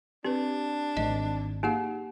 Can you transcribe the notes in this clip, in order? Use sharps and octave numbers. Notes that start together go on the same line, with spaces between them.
C4 D4 G4 B4
G#1 D#5
A#3 D#4 G4 G#4 F5 F#5